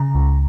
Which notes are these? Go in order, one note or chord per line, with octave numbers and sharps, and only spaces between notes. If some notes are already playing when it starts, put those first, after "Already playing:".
Already playing: C#3 A#5
C#2